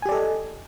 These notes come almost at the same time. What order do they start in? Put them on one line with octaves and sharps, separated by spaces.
G#5 G4 D5 A4 D#5